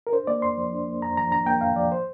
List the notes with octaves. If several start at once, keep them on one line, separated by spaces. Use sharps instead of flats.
A#4
D4 C5
A#3 D5
F2 C6
F3
D4
A#3
F2 A#5
F3 A#5
D4 A#5
A#3 G5
F2 F5
F3 D5
C5